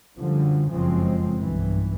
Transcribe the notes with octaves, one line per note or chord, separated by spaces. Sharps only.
F#2 D3 F3 G3
F#1 F2 C#3 F3 G#3 C4
B1 G2 E3